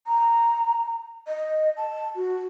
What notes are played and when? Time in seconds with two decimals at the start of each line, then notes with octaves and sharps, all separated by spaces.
0.07 A#5
1.28 D#5
1.77 A5
2.16 F#4